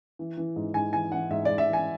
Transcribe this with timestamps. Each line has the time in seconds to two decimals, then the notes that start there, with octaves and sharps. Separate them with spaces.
0.19 E3
0.37 E3
0.56 G#2
0.74 G#2 G#5
0.93 E3 G#5
1.12 E3 F#5
1.31 G#2 E5
1.45 D5
1.49 G#2
1.58 E5
1.68 E3
1.73 G#5